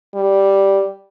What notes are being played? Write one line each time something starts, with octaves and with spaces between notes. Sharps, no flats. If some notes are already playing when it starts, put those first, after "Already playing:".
G3